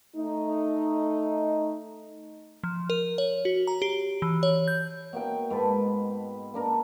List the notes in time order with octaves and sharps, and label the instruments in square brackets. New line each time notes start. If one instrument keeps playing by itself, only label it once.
[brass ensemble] A3 D#4
[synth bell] F3
A#4
C#5
F#4
A#5
G4
E3
C#5
G6
[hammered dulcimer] B2 A#3 G5
G#2 B4 A5
A#3 D4 A#4